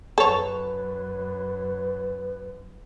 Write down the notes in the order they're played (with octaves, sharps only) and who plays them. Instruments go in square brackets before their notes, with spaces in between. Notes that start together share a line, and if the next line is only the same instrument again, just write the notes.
[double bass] F#2 [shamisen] A4 C#5 [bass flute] B4